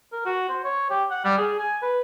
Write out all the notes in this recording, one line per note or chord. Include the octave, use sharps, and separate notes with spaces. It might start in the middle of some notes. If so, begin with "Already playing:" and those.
A#4
F#4
C5
C#5
G4
F#5
G3
G#4
G#5
B4